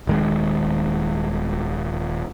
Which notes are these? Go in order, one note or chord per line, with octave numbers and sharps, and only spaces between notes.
D#1 D#3 G#3